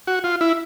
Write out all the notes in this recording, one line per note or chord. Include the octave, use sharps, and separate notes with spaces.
F#4
F4
E4